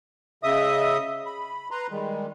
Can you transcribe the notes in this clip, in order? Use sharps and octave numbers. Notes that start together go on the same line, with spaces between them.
C#3 D#5 E5 D#6
B5
B4 A#5 C6
D#3 G3 G#3